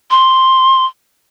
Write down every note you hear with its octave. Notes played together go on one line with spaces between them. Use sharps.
C6